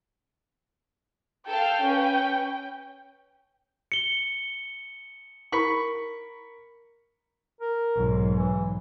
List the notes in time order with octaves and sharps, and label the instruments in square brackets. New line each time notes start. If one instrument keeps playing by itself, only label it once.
[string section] A4 F5 [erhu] G5
[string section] C#4 B4
[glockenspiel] C#7 G7
[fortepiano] A#4 B5 C#6
[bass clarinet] A#4
[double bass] B1 G#2
[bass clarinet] E3